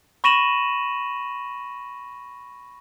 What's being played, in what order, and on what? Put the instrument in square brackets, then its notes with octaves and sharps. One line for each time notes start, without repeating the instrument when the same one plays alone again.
[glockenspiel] B5 C#6 A#6 D#7 E7 F#7